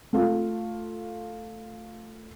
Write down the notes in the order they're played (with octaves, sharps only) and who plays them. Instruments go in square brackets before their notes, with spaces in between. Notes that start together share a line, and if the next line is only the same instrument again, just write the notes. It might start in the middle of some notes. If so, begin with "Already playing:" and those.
[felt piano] A3 F4